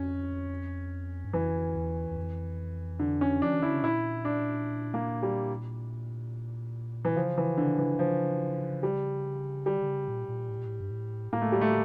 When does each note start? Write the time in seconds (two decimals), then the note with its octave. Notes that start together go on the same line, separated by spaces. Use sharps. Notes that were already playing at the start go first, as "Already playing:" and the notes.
Already playing: F2 C#4
1.25 G2
1.33 F2 E3
1.76 E2
2.11 E2
2.17 F2
3.00 D3
3.21 C#4
3.42 F3 D4
3.54 E3
3.63 D3 E4
3.73 C#3
3.83 A#2 E4
4.25 D4
4.94 A#3
5.23 G3
7.05 E3
7.16 C#3 F3
7.38 E3
7.58 D3
7.79 E3
7.99 F3
8.83 G3
9.66 D3 G3
9.82 D3
9.87 C#3
10.08 A#2
10.28 A#2
10.49 A2
10.58 A#2
10.66 A2
10.80 G2
10.90 A2
11.33 A2 A#3
11.42 A3
11.52 G3
11.61 A3